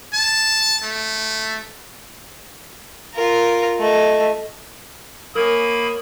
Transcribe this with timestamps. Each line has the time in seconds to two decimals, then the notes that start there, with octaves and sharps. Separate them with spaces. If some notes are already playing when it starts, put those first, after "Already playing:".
0.13 A5
0.83 A3
3.15 F4 A#4
3.78 A3 D#5
5.35 A#3 A#4 C#5 G#5 B5 D#6